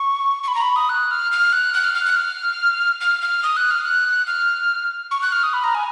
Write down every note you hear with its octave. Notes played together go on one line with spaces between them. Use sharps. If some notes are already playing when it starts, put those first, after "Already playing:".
Already playing: C#6
C#6
B5
A#5
B5
D#6
F#6
F6
F6
F#6
F#6
F6
F6
F#6
F6
F6
F6
D#6
F#6
F6
F#6
F6
C#6
F#6
F6
D#6
B5
A#5
G#5